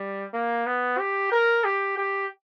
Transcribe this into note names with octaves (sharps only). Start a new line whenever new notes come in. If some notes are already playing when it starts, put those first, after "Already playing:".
Already playing: G3
A#3
B3
G4
A#4
G4
G4